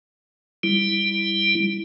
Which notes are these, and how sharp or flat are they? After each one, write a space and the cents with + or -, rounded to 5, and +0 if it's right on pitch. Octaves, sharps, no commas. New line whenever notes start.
G3 +10 E4 +0